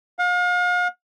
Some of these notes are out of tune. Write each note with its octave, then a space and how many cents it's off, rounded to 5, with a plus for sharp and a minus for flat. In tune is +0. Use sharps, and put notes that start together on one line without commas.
F5 +40